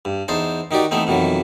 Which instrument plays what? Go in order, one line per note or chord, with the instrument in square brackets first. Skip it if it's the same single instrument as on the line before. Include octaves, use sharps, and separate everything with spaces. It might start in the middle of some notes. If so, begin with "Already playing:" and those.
[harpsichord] G2
E2 D#4 C5 A5
D#3 D#4 F#4 G4 D5
E3 A3 B3 C4 D#4
F2 B2 D#3 E3 F#3